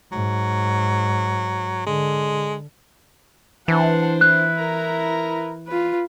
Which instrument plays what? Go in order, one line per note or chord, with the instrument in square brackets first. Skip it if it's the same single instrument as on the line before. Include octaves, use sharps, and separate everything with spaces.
[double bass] G#2 [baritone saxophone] F#3
[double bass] D3 [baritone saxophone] G#3
[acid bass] E3 [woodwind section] D4 C5 [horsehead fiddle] F#5 A5
[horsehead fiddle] E4 B4 [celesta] F#6
[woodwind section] A#4 A#5
[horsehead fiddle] F4 B4